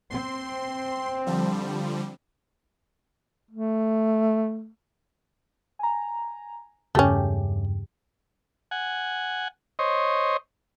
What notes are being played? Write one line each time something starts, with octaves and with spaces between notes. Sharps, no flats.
C4 C6
D3 F3 G3
A3
G#5 A#5
E2 G2 C#3 A3 C#4 G4
F#5 G#5
C5 C#5 D#5